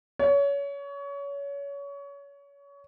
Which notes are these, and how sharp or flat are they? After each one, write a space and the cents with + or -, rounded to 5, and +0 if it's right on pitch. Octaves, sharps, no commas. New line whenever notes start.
C#5 +25